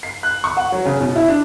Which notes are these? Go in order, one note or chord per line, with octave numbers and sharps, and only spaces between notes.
C7
F#6
C#6
F#5
F#3
C#3
B2
E4
D4